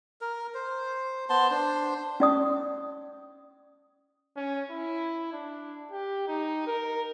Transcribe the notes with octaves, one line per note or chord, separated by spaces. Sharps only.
A#4
C5
B3 C5 A5 C6
D4 C5
C#4 D5 D#6
C#4
E4
D4
G4
D#4
A#4